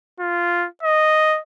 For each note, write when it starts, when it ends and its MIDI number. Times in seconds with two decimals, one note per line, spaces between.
0.20 0.67 65
0.83 1.39 75